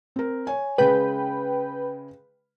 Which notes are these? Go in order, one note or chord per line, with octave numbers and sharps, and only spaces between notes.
C4 A#4
C#5 G#5
C#3 G#3 B4 G5